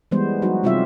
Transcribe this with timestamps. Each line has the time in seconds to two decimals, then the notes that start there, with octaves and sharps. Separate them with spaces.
0.11 E3 G3 G#3 B3 C5
0.42 F#3 D#4 F#4
0.63 C3 G3 F4 G4 E5